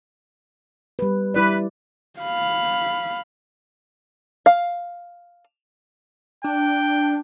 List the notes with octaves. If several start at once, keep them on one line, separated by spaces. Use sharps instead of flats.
G3 B4
G3 E4 B4 D5
F5 B5
F5
D4 G5